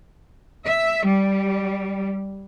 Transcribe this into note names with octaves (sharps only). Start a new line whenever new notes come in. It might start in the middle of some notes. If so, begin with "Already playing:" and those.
E5
G3